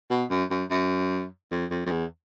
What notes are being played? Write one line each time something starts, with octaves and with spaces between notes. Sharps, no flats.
B2
F#2
F#2
F#2
F2
F2
F2
E2